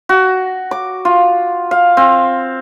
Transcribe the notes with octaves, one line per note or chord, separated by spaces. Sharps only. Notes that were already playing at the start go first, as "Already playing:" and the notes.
F#4
D6
F4
F5
C4